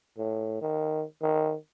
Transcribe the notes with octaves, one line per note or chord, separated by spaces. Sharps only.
A2
D#3
D#3